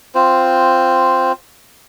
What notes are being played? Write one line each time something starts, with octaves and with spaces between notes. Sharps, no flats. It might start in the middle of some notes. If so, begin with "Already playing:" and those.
C4 F4 C5